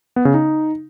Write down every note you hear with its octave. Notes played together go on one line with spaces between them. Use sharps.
B3
C#3
D#4